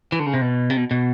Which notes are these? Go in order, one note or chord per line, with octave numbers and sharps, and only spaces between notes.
E3
D3
C#3
C3
B2
C3
B2
B2